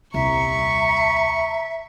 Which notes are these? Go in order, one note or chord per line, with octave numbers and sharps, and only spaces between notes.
D#1 C2 E5 A#5 C#6